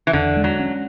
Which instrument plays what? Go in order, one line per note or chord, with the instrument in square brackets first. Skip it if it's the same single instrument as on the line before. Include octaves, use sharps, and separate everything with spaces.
[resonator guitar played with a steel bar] E3
[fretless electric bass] E2 [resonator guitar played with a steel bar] D3
[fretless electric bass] G#3
[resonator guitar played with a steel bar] F#3
[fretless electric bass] C#4